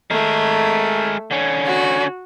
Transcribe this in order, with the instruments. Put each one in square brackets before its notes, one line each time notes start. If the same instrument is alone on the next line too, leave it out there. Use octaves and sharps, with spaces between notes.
[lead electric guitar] G#3 A#4 [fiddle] A3
[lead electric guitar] D3 C#4
[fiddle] F#4